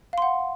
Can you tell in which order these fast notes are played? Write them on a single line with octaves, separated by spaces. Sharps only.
F5 C6 F#5